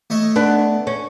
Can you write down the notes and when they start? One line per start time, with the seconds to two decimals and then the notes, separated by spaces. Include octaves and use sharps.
0.10 A3 C#5 D#5
0.36 B3 D4
0.87 C#4